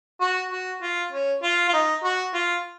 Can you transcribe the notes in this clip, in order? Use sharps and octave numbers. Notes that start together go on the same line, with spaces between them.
F#4
F#4
F4
C#4
F4
F4
D#4
F#4
F4